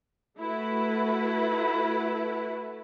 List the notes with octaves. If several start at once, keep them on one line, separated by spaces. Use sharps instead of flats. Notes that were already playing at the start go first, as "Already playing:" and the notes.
A3 E4 F#4 A4 B4